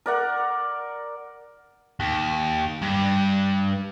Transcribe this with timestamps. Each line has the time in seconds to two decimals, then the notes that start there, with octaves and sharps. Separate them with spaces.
0.06 A#4 D5 F#5
2.00 D#2
2.82 G2